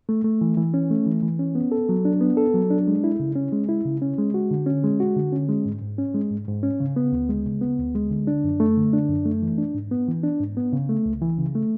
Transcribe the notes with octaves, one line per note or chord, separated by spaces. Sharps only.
A3
A3
E3
E3
C#4
A3
E3
E3
C#4
B3
A4
F#3
D4
B3
A4
F#3
D4
G#3
E4
C#3
C#4
G#3
E4
C#3
C#4
G#3
F#4
D3
C#4
G#3
F#4
D3
C#4
G#3
G#2
G#2
C#4
G#3
G#2
G#2
C#4
C#3
B3
D2
G#3
C#3
B3
D2
G#3
D3
D4
F#2
A3
D3
D4
F#2
A3
E3
D4
G#2
B3
E3
D4
G#2
B3
C#3
A3
C#2
E3
C#3
A3